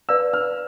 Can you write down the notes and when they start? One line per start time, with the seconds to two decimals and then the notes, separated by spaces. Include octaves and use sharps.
0.09 B4 D5 F5 E6
0.33 F6